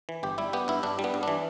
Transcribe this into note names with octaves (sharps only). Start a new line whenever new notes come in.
E3
G1 G4
G3 E4
B3 G4
G2 E4
G2 D4
G3
B3
G2
E3 D4